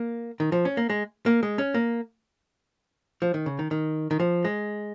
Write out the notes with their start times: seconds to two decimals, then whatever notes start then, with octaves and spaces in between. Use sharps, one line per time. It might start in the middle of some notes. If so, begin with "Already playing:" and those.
Already playing: A#3
0.40 D#3
0.52 F3
0.65 C#4
0.77 A#3
0.90 G#3
1.26 A#3
1.43 G#3
1.58 C#4
1.74 A#3
3.22 F3
3.34 D#3
3.46 C#3
3.59 D#3
3.71 D#3
4.11 D#3
4.20 F3
4.45 G#3